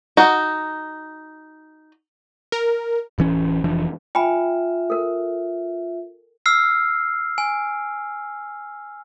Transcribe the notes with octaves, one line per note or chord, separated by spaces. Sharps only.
D#4 F#4
A#4
D1 E3 C#4
F1 E3 F3 D4
F4 E5 G5 G#5 B5
A4 A#4
E6 F6 C7
G#5